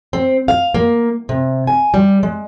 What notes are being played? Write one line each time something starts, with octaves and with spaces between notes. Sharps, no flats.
C4
F5
A#3
C3
G#5
G3
G#3